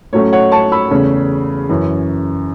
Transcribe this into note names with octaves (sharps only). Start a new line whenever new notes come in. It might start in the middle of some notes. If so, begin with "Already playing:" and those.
A2 F#3 A3 C#4 C#5
C#5 F#5
A5 C#6
B5 E6
E2 C#3 A3 C#4
F#2 E3 C#4